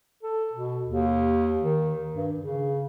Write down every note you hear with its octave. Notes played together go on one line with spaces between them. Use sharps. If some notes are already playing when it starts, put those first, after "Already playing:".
A4
B2
D#2
D#3
G2
C#3